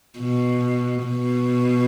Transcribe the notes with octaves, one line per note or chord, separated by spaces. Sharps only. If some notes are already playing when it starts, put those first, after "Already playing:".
B2
B2